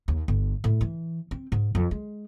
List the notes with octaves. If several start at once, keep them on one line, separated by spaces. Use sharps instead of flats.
D#2
G1
A2
E3
C4
G#2
F2
G#3